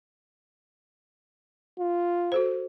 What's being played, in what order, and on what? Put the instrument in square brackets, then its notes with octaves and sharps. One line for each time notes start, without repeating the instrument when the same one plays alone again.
[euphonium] F4
[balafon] F#4 A4 C5